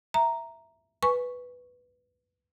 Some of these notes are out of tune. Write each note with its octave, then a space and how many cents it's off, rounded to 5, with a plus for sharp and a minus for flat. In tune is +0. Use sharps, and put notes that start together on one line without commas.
E5 +0 A#5 +0
B4 +0 G#5 +5 C#6 +0